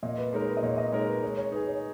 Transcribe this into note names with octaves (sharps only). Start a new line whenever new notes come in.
A#2 D#5
B4
G#3 D#4 A#4 C#5
B4
D#5
A#2 C#5
D#5
G#3 D#4 A#4 C#5
B4
G#3 C#5
C#5
D#4 G#4 B4
C#5